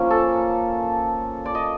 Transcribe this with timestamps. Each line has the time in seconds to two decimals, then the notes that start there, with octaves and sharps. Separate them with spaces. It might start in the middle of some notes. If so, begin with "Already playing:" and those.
Already playing: F3 A#3 C#4
0.11 A4
1.45 D5
1.55 D#5